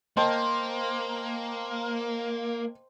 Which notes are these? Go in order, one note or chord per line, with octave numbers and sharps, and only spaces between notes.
A#3 C5 D#5 G5 A5